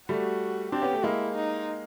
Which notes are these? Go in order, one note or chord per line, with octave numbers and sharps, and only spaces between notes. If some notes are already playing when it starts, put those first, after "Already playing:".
G3 A3 F#4
C4 D4 G4
B3 C#4
A3
G#3 A#3 E4
D#4